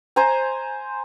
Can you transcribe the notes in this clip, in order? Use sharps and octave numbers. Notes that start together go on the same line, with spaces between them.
C5 G#5 A#5